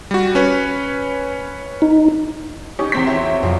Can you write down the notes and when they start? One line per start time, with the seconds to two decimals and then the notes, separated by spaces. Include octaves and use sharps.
0.11 G3 F#4
0.35 C#4 B4 C#5
1.82 D#4
2.79 C#4 D#4 G4
2.92 E2 C4 B6
3.06 F#4 C#5 E5
3.42 C2 F2 F#3